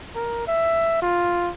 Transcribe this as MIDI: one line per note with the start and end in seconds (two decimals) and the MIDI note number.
0.15 0.43 70
0.48 0.98 76
1.02 1.51 65